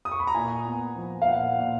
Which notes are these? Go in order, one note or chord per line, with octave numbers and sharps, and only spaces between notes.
D#6
C#6
B5
A#5
A#2 G#5
B3
F3
F5
A#2 F#5
A#2